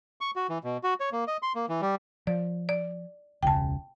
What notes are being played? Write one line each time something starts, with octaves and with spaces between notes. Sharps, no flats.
C#6
F#4
E3
B2
F#4
C#5
A#3
D#5
C6
A#3
E3
G3
F3 D5
D5
E1 C#2 C#3 G5 A5